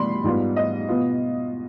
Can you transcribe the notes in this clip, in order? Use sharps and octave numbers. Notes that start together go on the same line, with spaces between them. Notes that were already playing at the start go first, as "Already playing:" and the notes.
Already playing: B2 G3 D4 B5 C6
G#2 G3 B3 F4
D#5
B2 B3 F4